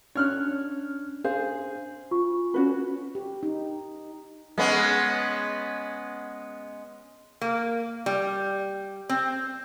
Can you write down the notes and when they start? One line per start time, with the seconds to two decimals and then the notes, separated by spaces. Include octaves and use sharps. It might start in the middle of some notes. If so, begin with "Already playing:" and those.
0.15 C#4 D4 C#5 F6 F#6
1.24 G#4 C5 F5
2.11 F4 C#6
2.54 C#4 F#4 B4
3.15 G4
3.43 D#4
4.58 G#3 B3 C#4
7.41 A#3
8.06 G3
9.09 C4